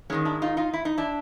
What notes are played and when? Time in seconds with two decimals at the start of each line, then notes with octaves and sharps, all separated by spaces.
0.10 G#2 D#3 G#3 C#4 D#4
0.25 D4 E4
0.42 D#4 F4
0.57 D#4 F4
0.74 E4
0.85 D#4
0.98 D4 E4